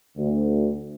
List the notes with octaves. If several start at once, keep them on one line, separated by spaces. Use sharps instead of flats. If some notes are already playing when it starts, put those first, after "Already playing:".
D2